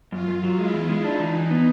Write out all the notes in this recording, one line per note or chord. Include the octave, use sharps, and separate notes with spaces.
F#2 F4
F#2
F#3
G#3 E4
E2
G#3
D4 D#4
E3
E3
B3